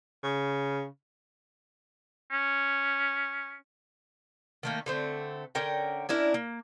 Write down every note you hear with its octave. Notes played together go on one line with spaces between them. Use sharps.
C#3
C#4
D#3 A3 A#3
D3 A3 C4
D3 C#4 A#4 G5
C#4 D4 E4 A#4
A#3